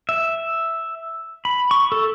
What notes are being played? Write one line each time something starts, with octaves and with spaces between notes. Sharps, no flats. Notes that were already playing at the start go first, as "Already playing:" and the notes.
E5
B5
C#6
A4